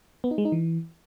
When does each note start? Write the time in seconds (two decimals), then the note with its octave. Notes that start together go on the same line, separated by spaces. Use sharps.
0.24 B3
0.31 D#4
0.38 G#3
0.45 D#4
0.52 E3